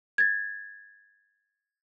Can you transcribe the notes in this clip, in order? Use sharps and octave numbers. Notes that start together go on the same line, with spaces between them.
G#6 A6